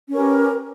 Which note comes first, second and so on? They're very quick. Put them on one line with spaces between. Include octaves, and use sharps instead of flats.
C#4 A#4 B4 G4